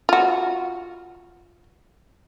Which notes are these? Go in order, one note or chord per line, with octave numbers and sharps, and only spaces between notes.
F4 F#4